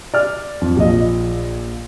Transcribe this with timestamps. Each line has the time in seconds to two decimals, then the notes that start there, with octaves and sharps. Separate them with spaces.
0.14 D5 F6
0.61 F2
0.77 A#1 F3 D#5